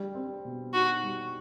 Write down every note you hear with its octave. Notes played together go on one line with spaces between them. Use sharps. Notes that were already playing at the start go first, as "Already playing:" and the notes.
Already playing: G3
C4
B2
D#4 F#4
G3